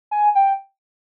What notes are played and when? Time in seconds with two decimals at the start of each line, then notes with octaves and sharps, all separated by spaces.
0.11 G#5
0.35 G5